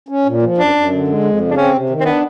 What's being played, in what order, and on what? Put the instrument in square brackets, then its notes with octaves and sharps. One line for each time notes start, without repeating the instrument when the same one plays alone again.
[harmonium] C#4
A#2
F3
[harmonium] F#2 [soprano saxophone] D4
[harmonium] F#2
D3
G#3
F2
C#3
[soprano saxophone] D4
[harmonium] C4 [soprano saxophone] C#4
[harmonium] C3
D#3
[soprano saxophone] C4
[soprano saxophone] B3 [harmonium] D4